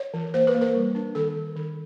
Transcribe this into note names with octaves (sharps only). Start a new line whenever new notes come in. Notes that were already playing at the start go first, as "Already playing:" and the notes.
Already playing: C#5
E3
A#3 C5
B4
A#3
A#4
G3
D4
D#3 A4
D#3
D#3